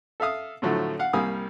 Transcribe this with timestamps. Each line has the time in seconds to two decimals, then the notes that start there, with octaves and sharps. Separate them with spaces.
0.20 A4 E5 F5 D#6
0.62 A2 D3 F3 F#3 A3
0.99 F5 F#5
1.13 C2 G3 A#3 F5 G#5 D#6